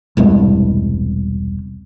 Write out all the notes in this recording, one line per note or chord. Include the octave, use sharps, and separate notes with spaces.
E1 C2 G2 G#3